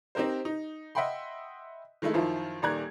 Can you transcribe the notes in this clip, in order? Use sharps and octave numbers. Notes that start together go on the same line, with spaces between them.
C4 D#4 G4 A#4 C5
D#4
D#5 E5 F#5 G5 B5 C6
D#3 G#3 A3 E4
F#2 D#3 F3 E4 F4
D#1 D#3 D5 A#5 F#6 G#6